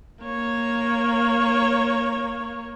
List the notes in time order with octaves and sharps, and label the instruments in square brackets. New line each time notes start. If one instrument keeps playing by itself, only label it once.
[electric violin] A#3 C#5